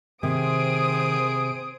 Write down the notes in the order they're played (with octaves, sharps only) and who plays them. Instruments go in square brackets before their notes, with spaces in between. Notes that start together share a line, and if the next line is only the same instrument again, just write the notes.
[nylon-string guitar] C3 [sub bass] D#3 [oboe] G#4 [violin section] C5 D#6 D7